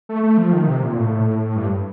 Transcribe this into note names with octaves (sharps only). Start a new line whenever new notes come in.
A3
A3
F3
D#3
C3
A#2
A2
G2